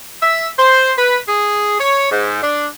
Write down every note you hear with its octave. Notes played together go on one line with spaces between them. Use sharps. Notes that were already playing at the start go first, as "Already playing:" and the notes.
E5
C5
B4
G#4
C#5
G#2
D4